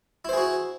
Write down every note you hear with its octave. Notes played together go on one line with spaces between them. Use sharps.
E4 F#4 G#4 C5